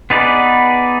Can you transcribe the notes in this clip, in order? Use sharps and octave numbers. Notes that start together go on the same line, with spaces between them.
B3 D#4 G#4 B4 D5